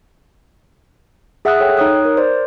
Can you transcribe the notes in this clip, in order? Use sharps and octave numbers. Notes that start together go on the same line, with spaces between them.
G#4 E5 F#5 D#6 E6 F#6
A4 C#5 G5
D#4 C#5 D#6 F#6
A#4
C5 D5